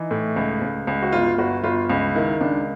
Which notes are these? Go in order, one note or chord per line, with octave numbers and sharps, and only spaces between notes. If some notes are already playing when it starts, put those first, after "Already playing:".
Already playing: E3 D#4
A2
C#2
C#2
C#2
F#4
G1 F4
G1 F#4
G1 F4
C#2
D#3 E4
C#2 D4